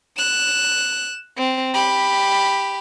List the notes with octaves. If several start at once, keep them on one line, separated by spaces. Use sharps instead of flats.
F#6 E7
C4
G4 B5